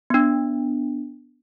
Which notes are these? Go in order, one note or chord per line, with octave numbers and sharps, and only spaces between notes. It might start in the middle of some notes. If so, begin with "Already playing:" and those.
B3 D4